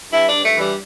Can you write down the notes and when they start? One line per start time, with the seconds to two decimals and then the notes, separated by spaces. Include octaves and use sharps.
0.12 G2 E4
0.29 G2 D4
0.45 A3
0.55 E3
0.60 G3